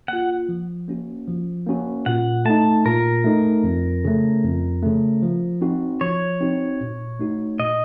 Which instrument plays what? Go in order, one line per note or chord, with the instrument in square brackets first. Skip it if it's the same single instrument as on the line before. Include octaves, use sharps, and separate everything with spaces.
[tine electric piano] A#3 F4 [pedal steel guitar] F#5
[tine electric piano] F3
A#3 C#4 F#4
F3
A#3 C#4 F#4
[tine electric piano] A#2 [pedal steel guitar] F#5
[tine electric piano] A3 D#4 [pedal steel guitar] A5
[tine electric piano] A#2 [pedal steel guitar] A#4
[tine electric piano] A3 D#4
F2
C#3 A3
F2
C#3 A3
F3
C4 D#4 F#4
[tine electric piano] F3 [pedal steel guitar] C#5
[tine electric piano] C4 D#4 F#4
A#2
A3 D#4 F#4
[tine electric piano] A#2 [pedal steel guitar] D#5